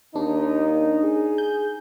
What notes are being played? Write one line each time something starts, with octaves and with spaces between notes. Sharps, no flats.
D#2 D4 D#4
G#4
G6